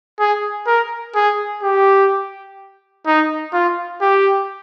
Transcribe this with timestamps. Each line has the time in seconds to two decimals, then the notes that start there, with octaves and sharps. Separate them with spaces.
0.19 G#4
0.67 A#4
1.15 G#4
1.63 G4
3.06 D#4
3.53 F4
4.01 G4